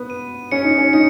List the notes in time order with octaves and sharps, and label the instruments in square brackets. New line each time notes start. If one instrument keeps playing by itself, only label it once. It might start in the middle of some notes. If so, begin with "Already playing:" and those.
Already playing: [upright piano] B3
[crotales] D#7
[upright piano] C#4 [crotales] C#7
[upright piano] D#4
C#4
[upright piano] D#4 [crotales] C#7